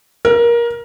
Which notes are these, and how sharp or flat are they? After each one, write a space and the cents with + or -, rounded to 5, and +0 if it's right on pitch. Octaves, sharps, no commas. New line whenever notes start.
A#4 +20